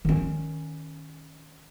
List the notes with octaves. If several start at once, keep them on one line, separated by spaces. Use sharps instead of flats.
D#3 C#4